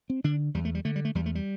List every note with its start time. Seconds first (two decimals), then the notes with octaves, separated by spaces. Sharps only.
0.10 C4
0.24 D3 D4
0.54 E2 G3
0.65 A3
0.75 G3
0.85 D3 A3
0.96 G3
1.05 A3
1.15 E2 G3
1.26 A3
1.35 G3